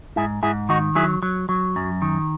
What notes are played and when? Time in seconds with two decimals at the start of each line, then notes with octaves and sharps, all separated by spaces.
0.16 G#2 E4 G#4
0.43 G#2 E4 G#4
0.69 D#3 D#4 F#4
0.95 F#3 E4 G#4
1.23 F#3
1.49 F#3
1.76 F#2
2.02 D#3